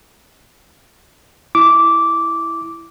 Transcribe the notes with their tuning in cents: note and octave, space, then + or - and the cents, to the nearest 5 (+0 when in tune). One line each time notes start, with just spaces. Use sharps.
E4 +0 D6 -10